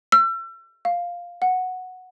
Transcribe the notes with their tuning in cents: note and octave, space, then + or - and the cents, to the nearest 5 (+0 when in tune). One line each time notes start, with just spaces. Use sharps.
E6 +40
F5 +5
F#5 -5